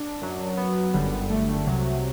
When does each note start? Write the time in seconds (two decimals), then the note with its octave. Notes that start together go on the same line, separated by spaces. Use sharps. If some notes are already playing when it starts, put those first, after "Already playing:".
Already playing: D4
0.21 F#2 F#3
0.57 B3
0.94 G1 F#2 D3 G3
1.30 A3
1.67 C2 C3 F#3